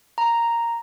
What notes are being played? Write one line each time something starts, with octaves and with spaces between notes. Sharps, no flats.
A#5